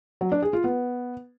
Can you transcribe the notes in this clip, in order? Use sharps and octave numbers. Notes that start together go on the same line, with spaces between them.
F#3
D4
G#4
F4
B3